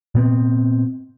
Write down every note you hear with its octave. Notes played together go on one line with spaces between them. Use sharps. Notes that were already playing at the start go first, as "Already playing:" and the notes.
A#2 B3 C4